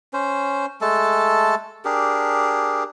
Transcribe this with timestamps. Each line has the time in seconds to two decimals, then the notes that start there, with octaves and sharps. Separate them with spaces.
0.13 C#4 C5
0.81 G#3 A3 A4 A5
1.85 D4 G4 G#4 A#4